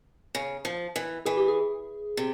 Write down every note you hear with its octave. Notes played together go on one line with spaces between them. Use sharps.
C#3
F3
E3
E3 G#4
G4
G#4
C3